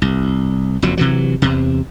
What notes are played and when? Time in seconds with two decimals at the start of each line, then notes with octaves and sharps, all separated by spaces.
0.02 C2
0.82 F#1 F2 F#3
0.97 C3 E3 F#3
1.42 E2 C3